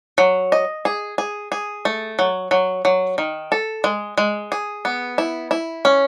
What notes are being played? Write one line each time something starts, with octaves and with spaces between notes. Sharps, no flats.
F#3
D#5
G#4
G#4
G#4
A3
F#3
F#3
F#3
D#3
A4
G#3
G#3
G#4
B3
E4
E4
C#4